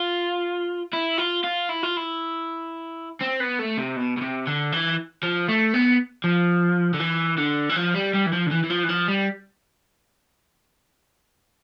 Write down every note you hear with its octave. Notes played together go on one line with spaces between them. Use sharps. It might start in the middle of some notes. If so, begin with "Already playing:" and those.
Already playing: F4
E4
F4
F4
E4
F4
E4
C4
B3
A3
C3
B2
B2
C3
D3
E3
F3
A3
B3
F3
D3
E3
D3
E3
F3
G3
G3
E3
F3
D3
E3
E3
F3
E3
F3
G3